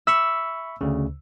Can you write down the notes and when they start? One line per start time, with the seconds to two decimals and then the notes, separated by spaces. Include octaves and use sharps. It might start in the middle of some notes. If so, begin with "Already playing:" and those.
0.07 E5 B5 C#6 E6
0.81 D2 C#3